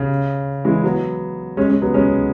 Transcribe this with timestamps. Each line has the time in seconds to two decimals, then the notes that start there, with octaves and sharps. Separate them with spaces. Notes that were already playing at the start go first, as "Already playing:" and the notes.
Already playing: C#3
0.65 E3 G#3
0.83 F#3 B3
1.57 G#3 C#4
1.69 G#3 C#4
1.82 F#3 B3
1.94 G#3 C#4